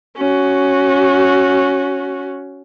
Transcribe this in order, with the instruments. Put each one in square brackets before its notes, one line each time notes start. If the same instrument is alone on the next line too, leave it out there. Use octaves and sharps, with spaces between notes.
[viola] C#4 F#4